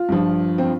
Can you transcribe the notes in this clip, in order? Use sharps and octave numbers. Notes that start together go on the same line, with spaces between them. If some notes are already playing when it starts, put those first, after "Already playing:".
Already playing: F4
G2 F3
C4